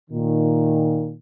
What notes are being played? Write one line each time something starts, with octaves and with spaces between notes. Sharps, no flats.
A#2 D#3